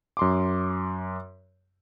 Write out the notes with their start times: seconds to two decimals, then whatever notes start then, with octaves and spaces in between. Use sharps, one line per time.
0.17 F#2 C6 D6